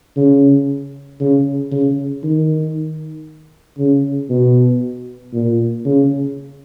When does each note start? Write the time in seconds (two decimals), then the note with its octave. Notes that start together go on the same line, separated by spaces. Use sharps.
0.16 C#3
1.20 C#3
1.72 C#3
2.23 D#3
3.78 C#3
4.30 B2
5.33 A#2
5.85 C#3